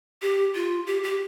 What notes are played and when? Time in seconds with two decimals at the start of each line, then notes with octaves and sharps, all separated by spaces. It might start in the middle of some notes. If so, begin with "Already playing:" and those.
0.22 G4
0.55 F4
0.87 G4
1.04 G4